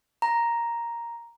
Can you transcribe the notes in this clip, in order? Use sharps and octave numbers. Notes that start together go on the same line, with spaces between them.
A#5